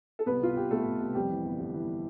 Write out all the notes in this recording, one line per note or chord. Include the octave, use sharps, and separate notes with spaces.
A4
C2 B3 B4
C2 F4
C2 G4
B2 A3 A4
B2
C2
F2 G3 G4
E3
G1
G1
E3